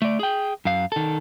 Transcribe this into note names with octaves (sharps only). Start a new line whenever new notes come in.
A3 D5
G#4 G5
F#2 F5
D#3 A4